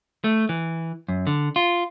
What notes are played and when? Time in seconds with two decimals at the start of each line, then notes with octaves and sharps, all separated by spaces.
0.24 A3
0.49 E3
1.09 F#2
1.27 D3
1.56 F4